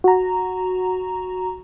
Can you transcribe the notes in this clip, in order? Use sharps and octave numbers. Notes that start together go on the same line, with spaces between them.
F#4 A#5